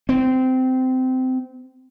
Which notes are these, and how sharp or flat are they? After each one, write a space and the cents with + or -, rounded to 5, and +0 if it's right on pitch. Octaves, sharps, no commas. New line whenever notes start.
C4 -20